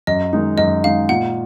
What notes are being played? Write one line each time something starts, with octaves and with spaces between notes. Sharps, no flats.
F#2 D#5
D#3 G#3 D#4
F#2 D#5
D#3 G#3 D#4 F5
A#2 F#5